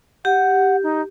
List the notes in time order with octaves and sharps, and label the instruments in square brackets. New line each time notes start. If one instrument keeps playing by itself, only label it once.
[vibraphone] G4 [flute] F#5
[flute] D#4